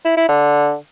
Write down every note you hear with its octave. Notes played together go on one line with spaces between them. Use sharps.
E4
E4
D3